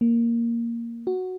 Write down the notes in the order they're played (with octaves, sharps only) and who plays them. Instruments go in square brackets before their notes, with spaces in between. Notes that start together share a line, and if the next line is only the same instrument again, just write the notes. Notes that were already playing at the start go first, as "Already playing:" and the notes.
[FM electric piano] A#3
F#4